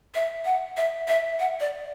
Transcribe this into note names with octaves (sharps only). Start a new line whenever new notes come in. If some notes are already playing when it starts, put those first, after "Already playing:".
E5
F#5
E5
E5
F#5
D5